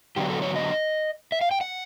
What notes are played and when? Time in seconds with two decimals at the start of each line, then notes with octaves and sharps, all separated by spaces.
0.16 D3 F#3 B3 D4 G4
0.30 A4
0.42 C#5
0.56 D#5
1.32 E5
1.41 F5
1.51 G5
1.61 F#5